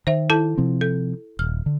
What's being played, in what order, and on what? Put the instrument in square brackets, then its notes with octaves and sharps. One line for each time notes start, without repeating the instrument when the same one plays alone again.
[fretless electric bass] D#3 [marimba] C5 E5
[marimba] E4 A4 A5
[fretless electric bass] C3 F3 C4
[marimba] A4
[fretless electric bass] D#1 [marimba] F6
[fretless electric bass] D3